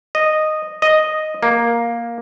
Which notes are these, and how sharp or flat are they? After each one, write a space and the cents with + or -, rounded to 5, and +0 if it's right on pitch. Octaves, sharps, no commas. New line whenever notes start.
D#5 -5
D#5 +0
A#3 +5